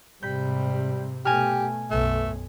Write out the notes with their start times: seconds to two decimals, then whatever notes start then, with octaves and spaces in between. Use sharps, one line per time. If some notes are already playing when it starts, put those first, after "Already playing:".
0.23 G#2 C3 G3 B5 G6
1.25 B2 A3 G4 G#5 A#5 F6
1.91 B1 F#2 A3